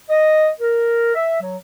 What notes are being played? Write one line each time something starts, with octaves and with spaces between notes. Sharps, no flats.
D#5
A#4
E5
F#3